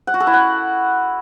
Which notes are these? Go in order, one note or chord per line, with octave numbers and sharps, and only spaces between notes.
F#5
F#4
A4
E4
F#5